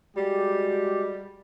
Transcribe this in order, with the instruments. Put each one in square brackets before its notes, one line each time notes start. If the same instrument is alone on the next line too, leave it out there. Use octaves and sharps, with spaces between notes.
[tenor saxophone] G3 [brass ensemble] G#3 F#4 G4